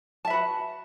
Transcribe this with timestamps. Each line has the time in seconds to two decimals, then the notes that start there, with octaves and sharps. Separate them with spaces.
0.25 A5
0.27 E5
0.30 B4
0.33 F#4